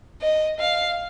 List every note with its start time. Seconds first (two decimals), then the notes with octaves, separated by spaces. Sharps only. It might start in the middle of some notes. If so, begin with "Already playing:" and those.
0.22 D#5
0.60 F5